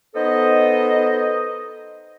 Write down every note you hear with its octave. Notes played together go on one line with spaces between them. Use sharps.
B3 D#4 A4 C5 D#5